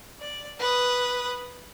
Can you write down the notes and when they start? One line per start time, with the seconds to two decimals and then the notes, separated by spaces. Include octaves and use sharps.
0.20 D5
0.59 B4 D#6